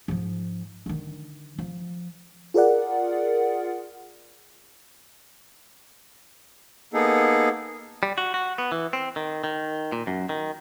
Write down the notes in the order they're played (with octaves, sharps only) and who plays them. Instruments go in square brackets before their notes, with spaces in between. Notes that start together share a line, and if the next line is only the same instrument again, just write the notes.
[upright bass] G#2 F3
D3 D#3
F3
[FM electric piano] F4 G#4 A#4 D5 F#5
[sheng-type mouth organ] A#3 B3 D#4 G#4 A4
[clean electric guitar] G3
F#4
F#4
B3
E3
C4
D#3
D#3
A#2
F#2
D#3